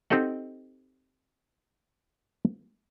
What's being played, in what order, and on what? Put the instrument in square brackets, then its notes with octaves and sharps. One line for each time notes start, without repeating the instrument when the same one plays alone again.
[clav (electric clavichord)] C4 D#4 G4 A4 D#5 F#5